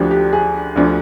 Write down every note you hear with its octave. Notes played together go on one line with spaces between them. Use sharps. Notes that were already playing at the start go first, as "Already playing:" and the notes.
Already playing: D2 D3 F3 G4
G4
G#4
D2 D3 F3